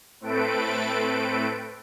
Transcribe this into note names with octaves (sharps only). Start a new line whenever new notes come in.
A2 A3 C4 A4 B4 D7